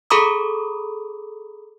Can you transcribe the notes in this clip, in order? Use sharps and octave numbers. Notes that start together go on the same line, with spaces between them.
G#4 A4 A#5 B5 D6 D#6